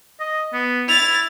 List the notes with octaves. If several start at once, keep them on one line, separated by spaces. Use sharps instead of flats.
D#5
B3
E4 A6 F7